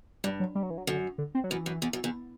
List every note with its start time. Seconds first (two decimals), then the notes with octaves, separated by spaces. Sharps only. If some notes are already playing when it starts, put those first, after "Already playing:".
0.24 G2 G3
0.40 F#3
0.55 G3
0.63 F#3
0.70 E3
0.78 F#3
0.87 F#2 D3
1.18 D3
1.35 C4
1.44 F#3
1.50 F#2 E3
1.66 F#2
1.82 E2
1.93 F#2
2.04 E2